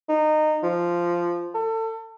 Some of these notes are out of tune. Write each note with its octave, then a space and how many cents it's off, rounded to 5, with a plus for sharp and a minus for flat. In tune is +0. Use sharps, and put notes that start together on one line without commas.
D#4 -20
F3 -10
A4 +30